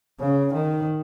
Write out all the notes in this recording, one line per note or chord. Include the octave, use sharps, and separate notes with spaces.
C#3
D#3